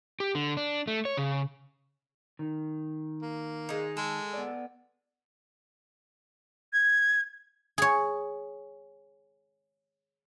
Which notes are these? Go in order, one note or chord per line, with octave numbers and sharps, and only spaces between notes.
G4
D3
D4
A3
C#5
C#3
D#3
A#3
G#3 D#4
G#3 A4
B3 D5
G#6
G#4 C#5